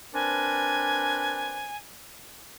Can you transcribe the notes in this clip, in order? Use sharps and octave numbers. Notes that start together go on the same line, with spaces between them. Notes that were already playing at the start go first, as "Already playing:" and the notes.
C4 D4 A#4 B4 D5 G#5